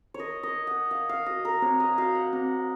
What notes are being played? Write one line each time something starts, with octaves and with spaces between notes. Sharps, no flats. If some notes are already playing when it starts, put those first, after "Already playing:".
C#5
A#4 D#5
D#5
A#4
F#5
A#4 F5
F5
F#4 D#5
A#4
C4 C#5
D#5
F#4 F5
F#5
C4